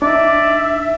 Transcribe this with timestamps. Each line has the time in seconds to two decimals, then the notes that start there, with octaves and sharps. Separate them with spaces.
0.02 D4 D#4 D5 E5